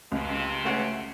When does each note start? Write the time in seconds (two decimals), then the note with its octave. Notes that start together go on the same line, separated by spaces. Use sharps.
0.12 C#2 C3
0.65 A3 C#4 F#5